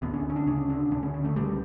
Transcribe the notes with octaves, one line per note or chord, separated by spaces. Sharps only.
D2 D3 B3
C#4
C#4
D4
D2 C#3 C#4
D4
D2 D3 C#4
C#4
C#4
A3
C#2 B2 G3